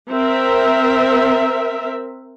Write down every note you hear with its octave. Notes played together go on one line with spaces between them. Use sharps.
C4 A#4 E5